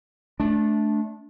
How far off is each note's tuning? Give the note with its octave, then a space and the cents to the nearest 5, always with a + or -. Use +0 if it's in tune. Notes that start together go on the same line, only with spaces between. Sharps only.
A3 -25 D4 -10